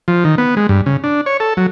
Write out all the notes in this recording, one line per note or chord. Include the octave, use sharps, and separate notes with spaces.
F3
D#3
B3
G#3
G2
C#3
D4
C#5
A4
F#3